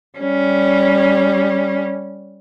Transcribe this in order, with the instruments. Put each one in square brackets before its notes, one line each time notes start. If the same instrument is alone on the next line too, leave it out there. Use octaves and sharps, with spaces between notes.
[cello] G3 C#4